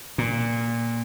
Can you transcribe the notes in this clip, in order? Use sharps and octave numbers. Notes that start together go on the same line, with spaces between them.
A#2